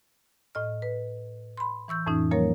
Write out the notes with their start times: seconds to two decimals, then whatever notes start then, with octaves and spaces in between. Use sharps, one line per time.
0.55 A2 D#5 F6
0.82 B4
1.58 B5 C6
1.88 E3 C#6 E6 G6
2.06 F2 A2 E3 C#4 D#4
2.31 F3 G3 A#3 A#4 C#5